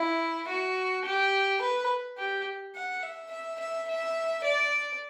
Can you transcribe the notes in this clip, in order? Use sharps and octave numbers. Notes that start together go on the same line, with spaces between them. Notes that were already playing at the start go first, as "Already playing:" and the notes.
Already playing: E4
F#4
G4
B4
G4
F#5
E5
E5
E5
E5
D5